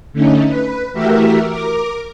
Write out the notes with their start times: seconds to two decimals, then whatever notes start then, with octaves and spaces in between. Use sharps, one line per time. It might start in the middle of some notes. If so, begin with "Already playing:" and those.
0.13 D3 A3 C#4 D#4
0.47 B4
0.93 E3 A3 F#4 G4 A#4 E5
1.47 A#4 D6